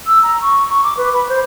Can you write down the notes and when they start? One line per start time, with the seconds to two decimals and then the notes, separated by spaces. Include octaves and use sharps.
0.07 E6
0.23 A#5
0.42 C#6
0.70 C#6
0.84 D6
0.97 B4
1.14 B5
1.29 C5